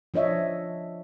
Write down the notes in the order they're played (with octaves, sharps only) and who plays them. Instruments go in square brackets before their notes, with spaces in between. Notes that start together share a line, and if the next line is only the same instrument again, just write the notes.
[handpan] F3 D4 C#5 D#5 E5